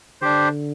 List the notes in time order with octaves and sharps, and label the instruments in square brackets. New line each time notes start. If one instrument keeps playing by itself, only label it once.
[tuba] D3 [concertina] D4 G4 C5